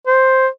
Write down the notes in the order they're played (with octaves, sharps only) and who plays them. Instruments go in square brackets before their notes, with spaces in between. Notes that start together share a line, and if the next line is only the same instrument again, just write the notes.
[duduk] C5